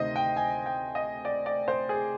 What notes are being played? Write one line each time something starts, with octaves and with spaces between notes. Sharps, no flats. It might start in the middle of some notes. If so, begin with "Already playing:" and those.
Already playing: D2 C3 D#3 C5 D#5
G5
G#5
G5
D#5
D5
D5
C5
G#4